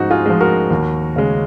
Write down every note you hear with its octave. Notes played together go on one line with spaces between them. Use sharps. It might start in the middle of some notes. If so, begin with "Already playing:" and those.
Already playing: G#2 F3 G#3 D#4 F#4
F4 G#4
F3 G#3
F#4 A#4
D#2
C#3 G#3